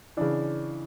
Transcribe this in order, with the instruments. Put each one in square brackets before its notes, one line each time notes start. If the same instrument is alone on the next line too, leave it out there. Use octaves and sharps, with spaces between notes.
[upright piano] C#3 E3 D4